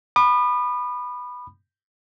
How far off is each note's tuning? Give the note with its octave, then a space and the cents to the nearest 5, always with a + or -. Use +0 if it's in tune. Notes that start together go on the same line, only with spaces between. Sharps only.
B5 +0 D#6 -40